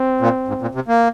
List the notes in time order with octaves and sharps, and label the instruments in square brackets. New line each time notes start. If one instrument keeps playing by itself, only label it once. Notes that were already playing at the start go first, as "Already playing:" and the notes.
Already playing: [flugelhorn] C4
[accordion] A#2
G#2
A#2
C3
A#3